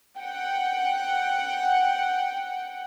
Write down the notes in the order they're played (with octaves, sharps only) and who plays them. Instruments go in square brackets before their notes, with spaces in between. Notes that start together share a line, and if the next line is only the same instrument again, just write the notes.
[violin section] F#5 G5